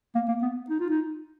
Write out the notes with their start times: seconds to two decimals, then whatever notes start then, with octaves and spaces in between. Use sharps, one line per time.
0.15 A#3
0.28 A#3
0.42 B3
0.70 D#4
0.80 F4
0.89 D#4